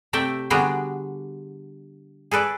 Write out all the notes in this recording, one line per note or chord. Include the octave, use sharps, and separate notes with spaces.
C3 A3 D5 E5 G5
D3 G3 B3 D4 F#4 G#4
G#4 A4 B4 D5